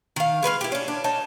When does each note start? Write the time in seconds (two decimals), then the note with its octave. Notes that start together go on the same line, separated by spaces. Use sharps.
0.16 D#3 F5
0.43 G#3 B4 C#5 F5
0.61 E4 G4
0.72 C#4 D4
0.88 D4
1.04 D#4 C#5 A5